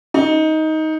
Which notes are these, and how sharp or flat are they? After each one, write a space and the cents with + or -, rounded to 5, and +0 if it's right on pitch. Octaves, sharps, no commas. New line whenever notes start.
D#4 +15